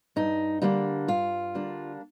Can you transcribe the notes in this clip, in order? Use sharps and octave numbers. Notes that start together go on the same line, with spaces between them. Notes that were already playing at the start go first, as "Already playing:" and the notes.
G2 D#4
D3 G3 A#3 D4 D#4
G2 F4
D3 G3 A#3 D4